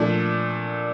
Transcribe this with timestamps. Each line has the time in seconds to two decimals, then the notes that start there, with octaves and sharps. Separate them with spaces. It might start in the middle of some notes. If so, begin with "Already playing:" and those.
Already playing: A#2 F3 A3 D4